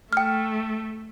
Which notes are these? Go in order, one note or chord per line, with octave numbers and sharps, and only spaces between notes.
A3 G5 F6